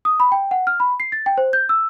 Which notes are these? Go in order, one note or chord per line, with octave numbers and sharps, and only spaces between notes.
D#6
B5
G5
F#5
F6
B5
C7
A6
G5
C5
G6
E6